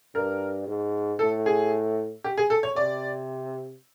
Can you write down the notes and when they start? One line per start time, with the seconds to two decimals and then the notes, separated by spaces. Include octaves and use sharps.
0.15 G2 A#4
0.67 G#2
1.19 A2 A4
1.46 G#4
2.24 G4
2.38 G#4
2.50 A4
2.63 C#5
2.76 C3 D5